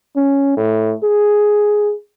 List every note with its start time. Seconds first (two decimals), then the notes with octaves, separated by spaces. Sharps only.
0.16 C#4
0.57 A2
1.03 G#4